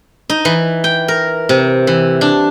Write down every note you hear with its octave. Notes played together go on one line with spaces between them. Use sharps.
D#4
E3
G5
A#4
C3
E3
D4